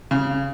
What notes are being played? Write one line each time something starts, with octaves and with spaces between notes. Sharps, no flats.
C#3